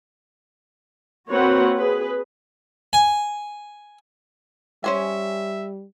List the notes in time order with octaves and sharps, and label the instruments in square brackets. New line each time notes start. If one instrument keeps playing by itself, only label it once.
[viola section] A#3 C4 F#4 B4 C#5 F#5
G#4 B4
[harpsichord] G#5
[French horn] G3 [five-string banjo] C#4 C5 G#5 [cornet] E5